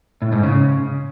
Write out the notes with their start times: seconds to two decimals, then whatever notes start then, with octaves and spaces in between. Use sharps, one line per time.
0.22 A2
0.32 G#2
0.43 C#3